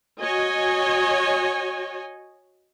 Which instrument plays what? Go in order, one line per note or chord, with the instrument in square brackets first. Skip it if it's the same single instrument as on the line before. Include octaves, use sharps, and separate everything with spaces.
[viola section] F#4 C#5 D#5 G#5